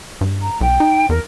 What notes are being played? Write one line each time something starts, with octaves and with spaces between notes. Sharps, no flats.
G2
A#5
B1 G5
D#4
E2 A#4